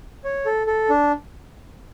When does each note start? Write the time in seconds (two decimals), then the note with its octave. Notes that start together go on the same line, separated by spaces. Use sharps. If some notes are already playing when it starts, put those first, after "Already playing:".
0.24 C#5
0.46 A4
0.67 A4
0.89 D4